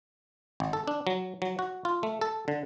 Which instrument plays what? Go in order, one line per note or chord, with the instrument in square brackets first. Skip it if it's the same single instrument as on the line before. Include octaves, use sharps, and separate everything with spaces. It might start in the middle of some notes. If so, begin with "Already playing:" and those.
[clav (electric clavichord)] G#1
A4
D4
F#3
F#3
F#4
F4
A3
A4
D3